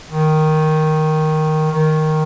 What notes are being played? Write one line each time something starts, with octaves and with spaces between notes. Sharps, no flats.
D#3
D#3